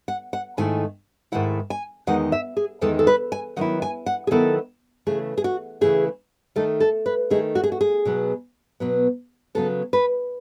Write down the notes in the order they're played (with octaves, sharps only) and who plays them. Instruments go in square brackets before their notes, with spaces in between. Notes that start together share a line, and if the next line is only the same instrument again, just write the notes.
[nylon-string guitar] F#5
F#5
G#2 D#3 A3 E4 G#5
G#2 D#3 A3 E4 F#5
G#5
E2 D#3 G#3 D#4 F#5
E5
G#4
E2 D#3 G#3 D#4 A4
A4
B4
G#5
D#3 F#3 B3 E4 F#5
G#5
F#5
G#4
D#3 F#3 B3 E4 A4
C#3 E3 A3 G#4
G#4
F#4
C#3 E3 A3 G#4
D#3 A3 D#4 A4
A4
B4
D#3 A3 D#4 G#4
F#4
G#4
F#4
G#4
B2 F#3 B3
B2 F#3 B3
C#3 F#3 B3 A4
B4